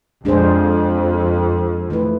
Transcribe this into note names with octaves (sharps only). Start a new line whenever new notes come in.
F2 G#3 D4 G#4 C5
E3 A3 E4 B4